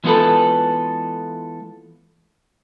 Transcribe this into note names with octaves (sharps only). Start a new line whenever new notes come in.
E3 G#3 B3 F4 A4 B4